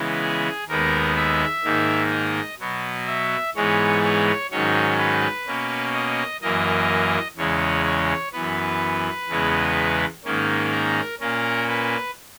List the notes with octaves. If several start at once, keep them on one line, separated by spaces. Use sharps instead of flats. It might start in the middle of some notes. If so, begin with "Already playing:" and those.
Already playing: C#3 E3 G#3 B3
G#4
D#2 D#3 G#3 B3 A#4
E5
G#2 D#3 A#3
D#5
B2 F#3 B3
E5
G#2 E3 G#3 B3 C#5
C#5
G#2 D#3 F#3 C#4 C#5
B4
B2 A#3 C#4
D#5
F#2 E3 A#3 D#5
E2 C#3 G#3 C#5
C#5
F#2 E3 B3 B4
E2 C#3 E3 G#3 B3
G#2 D#3 A#3 C#4
A#4
A#2 A#3 C#4 A#4
B4